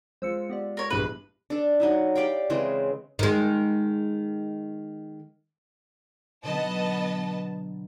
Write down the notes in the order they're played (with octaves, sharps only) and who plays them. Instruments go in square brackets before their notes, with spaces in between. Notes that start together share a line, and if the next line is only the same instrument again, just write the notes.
[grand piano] G#3 F4 [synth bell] C5 E6 C#7
[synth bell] B3 G4 D5
[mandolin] A#4 C#5
[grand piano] A#1 G2 E3 [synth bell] B3 G4 G#4 [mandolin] B4
[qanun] D4 A4
F#3 D#4 E4
G4 D5 F5 G5
C#3 E3 G#3 C4
[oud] D#3 G#3
[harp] B2 D3 F#3 [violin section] B3 D#5 A5